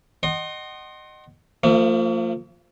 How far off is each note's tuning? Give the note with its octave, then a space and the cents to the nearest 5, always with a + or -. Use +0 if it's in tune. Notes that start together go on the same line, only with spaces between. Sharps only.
D#5 -20 F#5 +30 C6 +25
F3 +0 A#3 -45 E5 +35